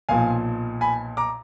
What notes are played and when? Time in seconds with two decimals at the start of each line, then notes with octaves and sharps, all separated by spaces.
0.09 B1 A#2 F3 F5 G#5
0.81 G#5 B5
1.17 A#5 D6